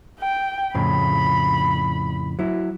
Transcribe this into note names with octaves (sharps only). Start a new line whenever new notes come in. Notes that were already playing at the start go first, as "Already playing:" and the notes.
G5
F2 A2 C#3 B5
F#3 E4